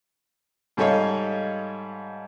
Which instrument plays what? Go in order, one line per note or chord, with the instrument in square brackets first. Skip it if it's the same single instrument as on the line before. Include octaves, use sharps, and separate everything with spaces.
[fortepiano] G#2 G3 A4 C#5 D#5 F5